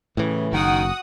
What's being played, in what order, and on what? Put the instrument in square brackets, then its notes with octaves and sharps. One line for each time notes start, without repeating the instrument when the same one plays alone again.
[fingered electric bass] A2 E3 [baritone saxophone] C#3
[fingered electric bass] F#1 [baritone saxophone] D#3 [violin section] F#4 F#5 D#6